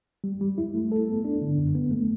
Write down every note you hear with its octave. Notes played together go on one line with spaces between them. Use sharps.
G3
G3
E4
A3
A4
B3
D4
D3
F#2
B3
A3